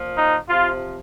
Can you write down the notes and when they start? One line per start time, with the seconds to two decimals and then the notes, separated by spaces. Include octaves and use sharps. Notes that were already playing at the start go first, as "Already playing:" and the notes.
Already playing: A#2 F3
0.18 D#4
0.48 C3 F3 F4